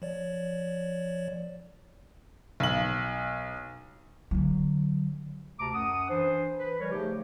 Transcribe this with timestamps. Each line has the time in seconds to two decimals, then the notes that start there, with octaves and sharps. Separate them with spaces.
0.02 F3 C#5 D5
2.60 B1 F#7
4.31 D3 F#3
5.60 D2 C3 A5 A#5 D6
5.74 F#2 F#5 D#6
6.10 E3 D4 C5
6.59 B4
6.80 E3 G3 A#4 C#5
6.92 C#3 F3 A3 D#4 G4